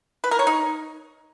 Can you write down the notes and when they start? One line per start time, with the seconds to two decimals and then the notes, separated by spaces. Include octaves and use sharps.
0.24 B4
0.31 A#4
0.39 C#5
0.47 D#4